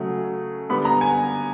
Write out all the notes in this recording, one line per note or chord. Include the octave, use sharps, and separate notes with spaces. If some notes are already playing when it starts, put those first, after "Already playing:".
Already playing: C#3 F#3 A3
D3 G3 B3 B5
A#5
G#5